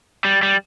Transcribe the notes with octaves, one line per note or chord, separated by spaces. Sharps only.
G3
G3